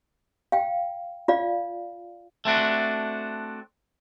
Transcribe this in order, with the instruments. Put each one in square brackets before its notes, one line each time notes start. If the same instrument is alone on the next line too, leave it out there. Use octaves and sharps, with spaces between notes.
[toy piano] F5 G5
F4 D5 F5
[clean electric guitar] A3 C4 D4 F#4